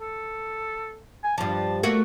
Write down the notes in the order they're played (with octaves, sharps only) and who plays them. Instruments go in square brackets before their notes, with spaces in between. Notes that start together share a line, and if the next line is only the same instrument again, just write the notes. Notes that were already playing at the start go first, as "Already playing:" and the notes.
[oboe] A4
G#5
[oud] G2 F3 [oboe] A5
[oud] A3 A#3 F#4